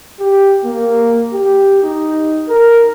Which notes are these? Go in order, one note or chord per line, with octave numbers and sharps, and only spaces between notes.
G4
A#3
G4
D#4
A#4